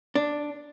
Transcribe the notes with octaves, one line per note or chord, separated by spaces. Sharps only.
D4